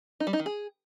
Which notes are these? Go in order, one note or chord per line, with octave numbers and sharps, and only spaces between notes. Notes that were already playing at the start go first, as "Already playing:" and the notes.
D#4
G3
D#4
D#3
G#4